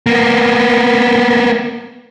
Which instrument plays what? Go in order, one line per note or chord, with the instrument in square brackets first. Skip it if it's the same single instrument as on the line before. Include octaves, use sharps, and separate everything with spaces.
[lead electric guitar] A#3 B3